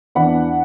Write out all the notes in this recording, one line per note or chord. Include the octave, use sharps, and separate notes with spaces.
E2 E3 D4 F#5 B5